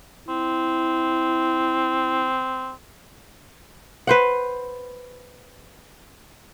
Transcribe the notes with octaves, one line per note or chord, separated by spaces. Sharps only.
C4 E4
B4 C5 F#5